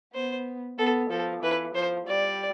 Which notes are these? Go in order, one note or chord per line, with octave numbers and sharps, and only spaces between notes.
B3 C5
B3 A4
F3 A4
E3 B4
F3 C5
G3 D5